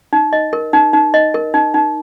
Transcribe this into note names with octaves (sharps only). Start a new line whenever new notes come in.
D#4
D#5
A#4
D#4
D#4
D#5
A#4
D#4
D#4